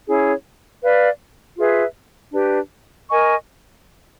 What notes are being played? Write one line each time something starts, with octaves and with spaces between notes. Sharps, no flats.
C#4 E4 G#4 C#5
B4 D5 F5
F4 G#4 B4 E5
D4 G4 B4
A#4 D#5 G#5 C#6